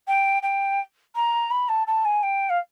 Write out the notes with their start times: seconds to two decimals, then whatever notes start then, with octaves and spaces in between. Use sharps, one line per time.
0.07 G5
0.42 G5
1.15 A#5
1.51 B5
1.68 A5
1.87 A5
2.05 G#5
2.23 G5
2.49 F5